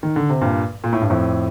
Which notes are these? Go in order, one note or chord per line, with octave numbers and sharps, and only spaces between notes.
D#3
D3
C3
G2 A#2
A#2
A2
G2
F2 A2